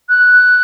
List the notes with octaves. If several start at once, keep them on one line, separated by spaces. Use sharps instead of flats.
F#6